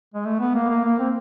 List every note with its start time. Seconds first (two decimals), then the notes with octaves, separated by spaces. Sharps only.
0.14 G#3
0.26 A3
0.40 B3
0.55 A#3
0.70 A#3
0.84 A#3
0.99 C4